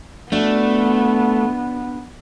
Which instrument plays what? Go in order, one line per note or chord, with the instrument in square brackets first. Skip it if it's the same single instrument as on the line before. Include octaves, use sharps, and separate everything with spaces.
[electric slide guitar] A3 [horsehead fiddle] B3 [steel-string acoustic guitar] D4 F#4